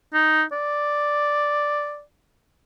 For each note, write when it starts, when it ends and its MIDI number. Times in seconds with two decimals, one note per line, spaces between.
0.14 0.43 63
0.52 2.02 74